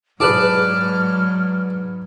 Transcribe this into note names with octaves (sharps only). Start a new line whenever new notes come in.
G#2 F#3 G#4 B4 D5 A5 D6 F6